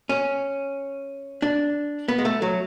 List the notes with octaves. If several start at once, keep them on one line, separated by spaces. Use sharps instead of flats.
C#4
D4
B3
G#3
A3
F#3